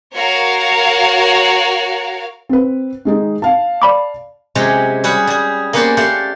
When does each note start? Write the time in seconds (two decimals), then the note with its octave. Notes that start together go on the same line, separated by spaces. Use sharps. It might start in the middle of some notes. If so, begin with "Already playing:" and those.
0.13 F#4 A#4 C#5 F5
2.49 C4 B4
3.05 D#3 G#3 D#4
3.42 F5 A5
3.82 D5 B5 D6
4.55 C3 F#3 G#3 C#4 G4
5.04 G3 F#4 G#4 B4 F#5
5.27 G3 G#4
5.73 A#3 B3 C#4 B4 C5 D5
5.97 A3 G4 C5 D5 F5 F#5